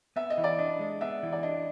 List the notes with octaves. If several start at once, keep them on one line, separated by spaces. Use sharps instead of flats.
B3 E5
D#5
E3
D5
D4 D#5
G#3
B3 E5
E3
D5
D4 D#5